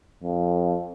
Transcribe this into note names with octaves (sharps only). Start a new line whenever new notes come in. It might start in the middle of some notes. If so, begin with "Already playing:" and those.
F2